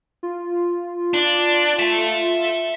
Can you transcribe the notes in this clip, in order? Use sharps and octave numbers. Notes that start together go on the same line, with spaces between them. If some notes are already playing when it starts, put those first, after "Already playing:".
F4
D4
E5 A5